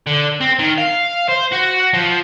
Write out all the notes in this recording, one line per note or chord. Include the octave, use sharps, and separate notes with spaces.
D3
C4
D#3
F5
C5
F#4
F3